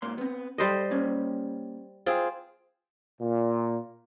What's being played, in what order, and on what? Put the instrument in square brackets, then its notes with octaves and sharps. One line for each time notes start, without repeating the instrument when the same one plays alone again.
[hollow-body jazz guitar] G#2 A#3 C6
B3 C4
[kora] G3 C5 D#5 [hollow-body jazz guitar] A4 B5
[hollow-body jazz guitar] A#3 C#4
[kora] C4 F4 G#4
[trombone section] A#2